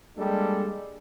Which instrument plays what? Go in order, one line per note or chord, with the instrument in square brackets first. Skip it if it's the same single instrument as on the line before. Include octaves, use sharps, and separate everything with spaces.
[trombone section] G3 G#3 A#3 D4 G4 A4